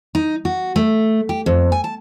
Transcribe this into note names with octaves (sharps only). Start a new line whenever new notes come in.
D#4
F#4
A3
G4
F2
G#5
A5